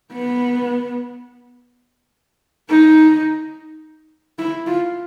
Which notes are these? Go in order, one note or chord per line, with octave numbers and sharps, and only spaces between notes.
B3
D#4
E4
F4